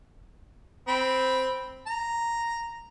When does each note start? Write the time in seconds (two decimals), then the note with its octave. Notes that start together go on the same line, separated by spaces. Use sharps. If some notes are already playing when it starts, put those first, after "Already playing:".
0.88 C4 B5
1.87 A#5